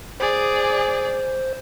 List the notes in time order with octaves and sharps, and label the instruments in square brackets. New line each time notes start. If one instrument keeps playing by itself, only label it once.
[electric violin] G#4 D5 [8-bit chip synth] C5